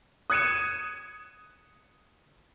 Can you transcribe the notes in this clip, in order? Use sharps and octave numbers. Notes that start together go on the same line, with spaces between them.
D#6 F#6 G#6 C#7 D#7 E7